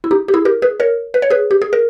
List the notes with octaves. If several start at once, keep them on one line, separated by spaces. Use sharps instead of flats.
E4
D#4 G4
G4
E4 G#4
G4 A#4
G#4 B4
A#4 C#5
B4
C#5
G#4 B4
G4
G#4
A#4